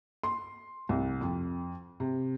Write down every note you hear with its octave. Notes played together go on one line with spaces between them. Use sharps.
C6
C2
F2
C3